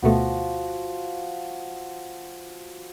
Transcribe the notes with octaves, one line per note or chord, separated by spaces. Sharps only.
D2 B2 F3 A3 F#4